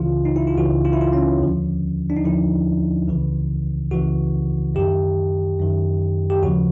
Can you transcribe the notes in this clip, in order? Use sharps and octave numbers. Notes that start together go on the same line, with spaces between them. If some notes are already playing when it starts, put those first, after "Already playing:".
Already playing: C#2 C#3 E3 F4
D#4
E4
F4
C#2 C#3 E3 F#4
F4
E4
F4
C#4
D#2 D3 F3
D4
D#4
D#2 D3 F3 E4
C#2 C#3 E3
C#2 C#3 E3 F#4
F#2 D#3 G4
F#2 D#3
G4
D#2 C#3 F3 F#4